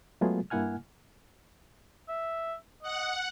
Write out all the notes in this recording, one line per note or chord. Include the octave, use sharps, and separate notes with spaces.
F#3 G#3 A3 B3 F4 G#4
G2 A#3 E4 F#5 G#5 F6
E5
D#5 F#5